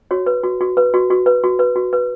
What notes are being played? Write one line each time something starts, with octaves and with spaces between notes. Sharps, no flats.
F#4 C#5
B4
F#4
F#4
B4
F#4
F#4
B4
F#4
B4
F#4
B4